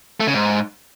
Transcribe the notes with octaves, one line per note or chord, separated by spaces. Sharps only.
A3
C#3
G#2